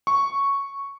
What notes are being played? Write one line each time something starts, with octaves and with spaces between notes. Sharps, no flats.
C#6